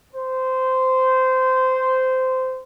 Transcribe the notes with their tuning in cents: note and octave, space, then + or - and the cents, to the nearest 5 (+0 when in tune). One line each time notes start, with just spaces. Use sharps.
C5 -15